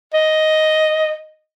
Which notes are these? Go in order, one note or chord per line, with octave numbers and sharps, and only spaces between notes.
D#5